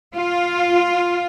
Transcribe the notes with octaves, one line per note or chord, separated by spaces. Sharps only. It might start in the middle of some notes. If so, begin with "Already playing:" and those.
F4